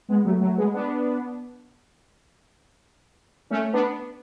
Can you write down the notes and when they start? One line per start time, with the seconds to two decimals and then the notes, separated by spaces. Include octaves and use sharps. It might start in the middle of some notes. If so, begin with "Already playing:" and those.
0.09 G#3 B3
0.25 F#3 A3
0.41 F#3 A3
0.57 G#3 B3
0.74 B3 D4
3.50 A3 C#4
3.73 B3 D4